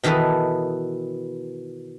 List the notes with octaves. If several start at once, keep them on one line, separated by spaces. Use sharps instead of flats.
B2 D#3 E3 E4 A4 B4